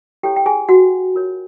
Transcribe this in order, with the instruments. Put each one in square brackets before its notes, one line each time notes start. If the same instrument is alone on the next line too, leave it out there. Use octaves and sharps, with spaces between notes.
[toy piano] E4 G4 A4 C#5 G5
G5
G#4 G#5
F#4 F#5
F4 A#4 C#5